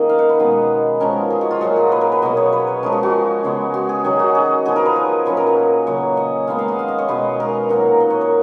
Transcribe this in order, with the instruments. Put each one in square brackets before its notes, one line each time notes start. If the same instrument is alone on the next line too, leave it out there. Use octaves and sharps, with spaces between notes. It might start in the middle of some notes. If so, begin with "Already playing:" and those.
Already playing: [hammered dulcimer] D#3 A#3 C#4 D#4 D#5
F5
F#5
B4
B2 G#3 B3 D#4
F3 G#3 C#4 A#4
G#4
F#4
F4
A#2 F#3 A#3 F#4
G#4
B4
A#4
B4
B2 F#3 A#3 D#5
C#5
B4
B4
F3 G#3 C#4 A#4
F#4
F#4
C#3 G#3 B3
F#4
G#4
D#3 F#3 C#4 G#4
F#4
G#4
F3 B3 D#4 G#4
A#4
B4
C#5
A#2 F#3 A#3 C#4 B4
A#4
B4
C#3 F#3 A#3 C#5
D#5
D#3 G#3 B3 F5
F5
D#5
F5
D#5
C#5
B2 G#3 D#4 B4
A#4
A#2 F#3 A#3 D#4 F#5
D#5
C#5
A#4